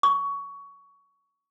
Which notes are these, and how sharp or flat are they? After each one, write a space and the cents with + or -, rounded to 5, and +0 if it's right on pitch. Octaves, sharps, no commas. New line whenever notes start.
C#6 +20